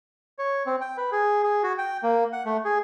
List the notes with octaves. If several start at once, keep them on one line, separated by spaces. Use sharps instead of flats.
C#5
C4
G5
B4
G#4
G#4
F#4
G5
A#3
F#5
A3
G#4